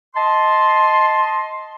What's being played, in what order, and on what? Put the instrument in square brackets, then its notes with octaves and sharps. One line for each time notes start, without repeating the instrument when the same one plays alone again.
[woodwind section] D#5 A5 C6